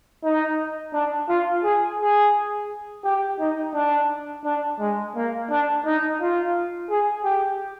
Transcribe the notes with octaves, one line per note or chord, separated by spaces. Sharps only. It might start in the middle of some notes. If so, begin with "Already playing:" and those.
D#4
D4
F4
G#4
G#4
G4
D#4
D4
D4
G#3
A#3
D4
D#4
F4
G#4
G4